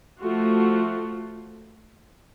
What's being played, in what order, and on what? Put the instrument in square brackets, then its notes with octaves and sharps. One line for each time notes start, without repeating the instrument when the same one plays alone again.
[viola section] F3 A3 F4 F#4